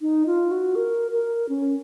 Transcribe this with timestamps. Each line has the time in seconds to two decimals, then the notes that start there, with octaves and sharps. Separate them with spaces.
0.01 D#4
0.26 F4
0.51 F#4
0.75 A#4
1.11 A#4
1.49 C#4